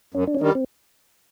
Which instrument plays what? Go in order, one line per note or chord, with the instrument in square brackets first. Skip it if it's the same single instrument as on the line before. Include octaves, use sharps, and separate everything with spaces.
[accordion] F#2 [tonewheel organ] C#4
[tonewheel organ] D4
C#4
[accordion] D#3 G3 [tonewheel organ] D4
[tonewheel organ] C4